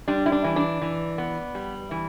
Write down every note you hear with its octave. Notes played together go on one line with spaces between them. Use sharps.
G3 D4
E4
D4
E3
D4
E3
B3
G3
E3